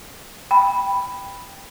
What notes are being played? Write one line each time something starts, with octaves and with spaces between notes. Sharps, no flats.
G5 B5